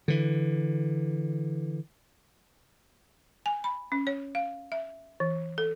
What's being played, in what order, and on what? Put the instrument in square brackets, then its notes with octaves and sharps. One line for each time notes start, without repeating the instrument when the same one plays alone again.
[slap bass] D3 E3
[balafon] G#5
B5
C#4
C#5
F5
E5
E3
A4